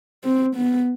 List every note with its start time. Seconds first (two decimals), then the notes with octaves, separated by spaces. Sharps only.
0.24 C4
0.56 B3